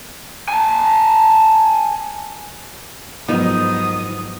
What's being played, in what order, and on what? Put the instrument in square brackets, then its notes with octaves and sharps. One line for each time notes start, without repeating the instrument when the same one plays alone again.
[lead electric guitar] G#5 A5
[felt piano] G#2 F3 F#3 [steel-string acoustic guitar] D#3 D#4 [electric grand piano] B3 [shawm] D#6